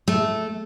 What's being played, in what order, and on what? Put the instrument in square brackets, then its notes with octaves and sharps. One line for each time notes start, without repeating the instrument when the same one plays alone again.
[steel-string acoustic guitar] A3